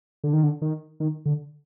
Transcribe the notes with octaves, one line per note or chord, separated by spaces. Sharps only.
D3
D#3
D3
D#3
D#3
D3